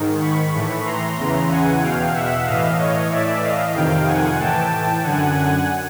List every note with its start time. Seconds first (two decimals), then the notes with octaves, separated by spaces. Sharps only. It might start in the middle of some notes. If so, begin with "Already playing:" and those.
Already playing: G#2 D#3
0.21 B5 C#6
0.54 A2 E3
0.85 A#5 C6
1.17 E2 C#3 E3
1.49 F#5 G#5
1.82 E2 B2 F5 G5
2.14 E5 F#5
2.46 A2 E3 D#5 F5
2.78 C#5 D#5
3.11 A2 E3 D5 E5
3.43 D#5 F5
3.75 F2 C3 D#3 F5 G5
4.07 F#5 G#5
4.39 A2 E3 G5 A5
5.04 F#2 D3 F#5 G#5
5.35 F#5 G#5